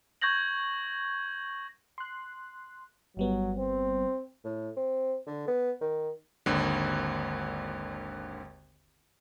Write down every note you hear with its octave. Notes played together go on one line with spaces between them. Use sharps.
C#6 G6 G#6 A#6 F#7
C6 F#6
G1 F#3 G3 B3
C4
A2
C4
D3
B3
D#3
G#1 D#2 D3